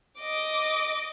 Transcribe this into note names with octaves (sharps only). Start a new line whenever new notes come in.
D#5 D6